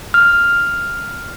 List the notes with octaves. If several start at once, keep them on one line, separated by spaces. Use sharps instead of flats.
F6